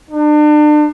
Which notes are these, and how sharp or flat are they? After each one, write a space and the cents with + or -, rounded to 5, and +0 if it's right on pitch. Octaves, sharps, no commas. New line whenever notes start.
D4 +35